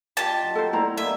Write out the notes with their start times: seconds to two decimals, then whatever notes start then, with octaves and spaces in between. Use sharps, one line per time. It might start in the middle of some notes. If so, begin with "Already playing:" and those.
0.17 F4 G4 D#5 A5
0.43 F#3 D#4
0.55 A4 C5
0.73 A3 E4 C5 D5 A#5 B5
0.97 A#3 B3 D#4 E5